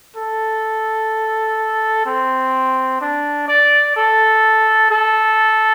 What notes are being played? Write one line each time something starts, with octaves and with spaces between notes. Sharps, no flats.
A4
C4
D4
D5
A4
A4